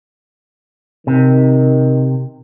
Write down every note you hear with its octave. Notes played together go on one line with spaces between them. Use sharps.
C3 D#3